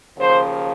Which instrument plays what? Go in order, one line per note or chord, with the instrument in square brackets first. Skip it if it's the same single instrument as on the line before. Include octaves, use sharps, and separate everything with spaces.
[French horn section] D#2 C#3 F3 C5